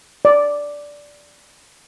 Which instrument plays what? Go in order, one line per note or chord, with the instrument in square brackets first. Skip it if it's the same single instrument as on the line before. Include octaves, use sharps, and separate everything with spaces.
[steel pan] D5